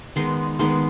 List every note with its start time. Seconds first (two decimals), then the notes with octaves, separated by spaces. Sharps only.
0.16 D#3 G#3 B3 D#4 C6
0.59 D#3 G#3 B3 D#4 C6